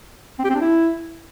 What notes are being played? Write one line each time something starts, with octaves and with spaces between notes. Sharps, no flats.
C4
G4
C4
D4
E4